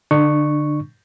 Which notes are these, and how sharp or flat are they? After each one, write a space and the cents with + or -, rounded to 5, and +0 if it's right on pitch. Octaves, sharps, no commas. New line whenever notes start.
D3 +0 D4 +35 C#6 +0